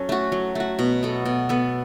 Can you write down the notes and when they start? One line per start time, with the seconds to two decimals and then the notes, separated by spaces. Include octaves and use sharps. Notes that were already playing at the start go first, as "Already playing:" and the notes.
Already playing: F#3 C#4 A4
0.09 A3 F#4
0.32 F#3
0.55 A3 F#4
0.79 B2
1.03 B3 A4
1.25 B2
1.49 B3 A4